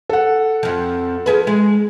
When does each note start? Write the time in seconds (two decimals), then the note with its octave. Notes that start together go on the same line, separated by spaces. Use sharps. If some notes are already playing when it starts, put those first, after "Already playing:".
0.10 A4 F#5
0.63 F2 F3
1.26 F3 G#4 B4
1.47 G#3